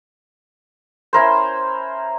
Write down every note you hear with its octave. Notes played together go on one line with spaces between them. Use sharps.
C#4 E4 A#4 C5